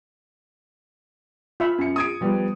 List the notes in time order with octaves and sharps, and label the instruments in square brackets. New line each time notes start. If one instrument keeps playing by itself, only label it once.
[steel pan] F4 E5 B5
[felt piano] F#2 C#7
D#6 G#6 D7
F3 G3 B3